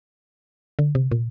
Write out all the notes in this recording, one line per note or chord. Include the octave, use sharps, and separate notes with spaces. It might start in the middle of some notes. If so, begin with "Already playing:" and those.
D3
C3
A#2